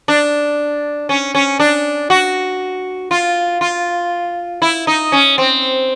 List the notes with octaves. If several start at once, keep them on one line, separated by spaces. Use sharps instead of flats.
D4
C#4
C#4
D4
F#4
F4
F4
E4
D#4
C#4
C4